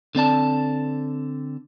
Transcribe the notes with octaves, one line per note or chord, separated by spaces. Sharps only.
D3 C4 D5 A5